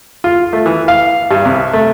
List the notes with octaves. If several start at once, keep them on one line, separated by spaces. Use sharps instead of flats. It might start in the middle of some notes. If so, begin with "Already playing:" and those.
F4
A3
E3
F5
G2
C2
A3